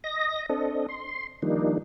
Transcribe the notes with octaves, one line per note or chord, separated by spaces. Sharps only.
D#5 A#6
C4 D4 A4 D#5
C6
D#3 F3 G3 A#3 D4 D#4